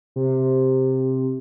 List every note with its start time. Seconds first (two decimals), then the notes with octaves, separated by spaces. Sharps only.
0.16 C3